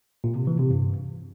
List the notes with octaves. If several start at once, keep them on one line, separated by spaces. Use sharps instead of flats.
A#2
C3
E3
C3
G2